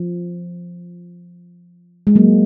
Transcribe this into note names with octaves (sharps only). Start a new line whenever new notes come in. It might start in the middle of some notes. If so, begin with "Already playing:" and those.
Already playing: F3
G#3
F#3 A#3